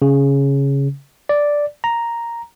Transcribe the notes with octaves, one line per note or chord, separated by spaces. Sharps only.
C#3
D5
A#5